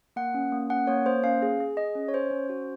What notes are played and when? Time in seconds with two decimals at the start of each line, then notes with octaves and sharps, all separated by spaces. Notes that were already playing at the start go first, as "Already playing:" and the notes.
0.16 A#3 F#5
0.34 C#4
0.52 A#3
0.70 C#4 F#5
0.87 A#3 C#5
1.06 A#3 C5
1.24 C#4 F5
1.42 G#4
1.60 G#4
1.77 G#4 D#5
1.95 C#4
2.08 C#5
2.13 C#4 C5
2.31 C#4
2.49 F#4